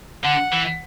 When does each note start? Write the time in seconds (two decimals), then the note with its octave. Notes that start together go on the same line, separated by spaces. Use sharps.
0.23 D3 F#5
0.52 E3